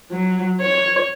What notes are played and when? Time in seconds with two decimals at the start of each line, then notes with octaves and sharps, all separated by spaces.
0.11 F#3
0.61 C#5